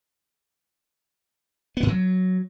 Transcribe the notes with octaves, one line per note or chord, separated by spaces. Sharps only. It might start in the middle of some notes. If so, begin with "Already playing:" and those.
B3
G#2
F#3